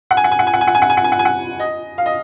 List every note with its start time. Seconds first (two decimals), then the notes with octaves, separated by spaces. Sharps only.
0.11 F#5
0.17 G#5
0.24 F#5
0.31 G#5
0.39 F#5
0.47 G#5
0.54 F#5
0.61 G#5
0.67 F#5
0.75 G#5
0.82 F#5
0.90 G#5
0.97 F#5
1.04 G#5
1.12 F#5
1.19 G#5
1.25 F#5
1.60 D#5
1.98 F5
2.06 D#5